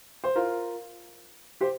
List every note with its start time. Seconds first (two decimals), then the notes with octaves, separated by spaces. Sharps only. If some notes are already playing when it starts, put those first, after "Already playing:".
0.24 C5
0.35 F4 A#4
1.61 G4 C5